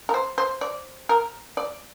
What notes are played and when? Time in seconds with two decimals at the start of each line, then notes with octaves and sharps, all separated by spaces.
0.09 A#4
0.14 C5
0.38 C5
0.61 D5
1.09 A#4
1.57 D5